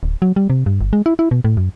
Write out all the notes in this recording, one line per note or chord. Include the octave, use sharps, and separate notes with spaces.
D1
F#3
G3
C3
G2
G1
G#3
E4
E4
B2
A2
F#2